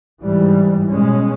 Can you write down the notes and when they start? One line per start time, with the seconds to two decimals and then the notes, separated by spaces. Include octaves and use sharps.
0.22 G#2 E3 G3
0.91 B2 G#3 C#4